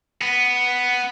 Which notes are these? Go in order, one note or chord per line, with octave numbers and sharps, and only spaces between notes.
B3